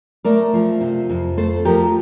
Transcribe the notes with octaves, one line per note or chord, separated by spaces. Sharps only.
A3 A#4 D5
F3
C3
F2
A3 A4 C5
F3 G4 A#4